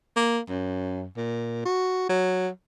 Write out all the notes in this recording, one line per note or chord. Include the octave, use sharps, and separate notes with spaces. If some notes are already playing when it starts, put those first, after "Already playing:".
A#3
F#2
A#2
F#4
F#3